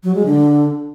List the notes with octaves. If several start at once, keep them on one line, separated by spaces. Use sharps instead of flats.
F#3
G#3
D3